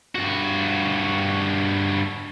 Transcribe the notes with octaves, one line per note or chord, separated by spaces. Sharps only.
G2 F#4